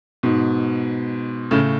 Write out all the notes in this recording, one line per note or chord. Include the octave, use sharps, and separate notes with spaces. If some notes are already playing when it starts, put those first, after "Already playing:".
G#2 B2
A2 C#3